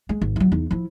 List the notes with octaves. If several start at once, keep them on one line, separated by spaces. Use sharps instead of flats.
G#3
G#1
E3 F#3
E2 D#4
F3 E4